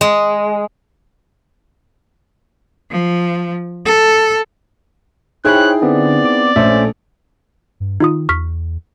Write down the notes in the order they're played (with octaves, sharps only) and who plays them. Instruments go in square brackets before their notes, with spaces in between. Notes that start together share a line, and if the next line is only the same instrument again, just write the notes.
[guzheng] G#3
[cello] F3
A4
[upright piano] D#4 E4 G#4 [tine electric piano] C5 C#5 B5 [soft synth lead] G5 [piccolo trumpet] F#6
[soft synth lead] D3 [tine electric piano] B3 C4 [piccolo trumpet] D5
[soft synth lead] D6
[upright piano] A#1 [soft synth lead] A3 [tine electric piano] C#4 C5 E5
[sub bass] G2
[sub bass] D#3 [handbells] D#4 F4 D#6
[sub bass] E2 [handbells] C#6 F6 B6